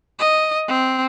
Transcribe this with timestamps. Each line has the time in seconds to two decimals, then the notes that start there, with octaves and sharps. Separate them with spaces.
0.19 D#5
0.68 C4